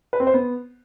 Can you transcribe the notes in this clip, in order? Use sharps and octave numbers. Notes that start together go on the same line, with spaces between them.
B4
C4
C5
B3